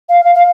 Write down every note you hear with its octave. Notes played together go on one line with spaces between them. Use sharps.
F5
F5
F5